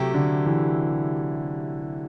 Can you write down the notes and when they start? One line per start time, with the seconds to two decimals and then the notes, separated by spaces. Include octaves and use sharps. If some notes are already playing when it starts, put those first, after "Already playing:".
Already playing: C3 F#3 A3 E4 G4
0.14 D3
0.46 E3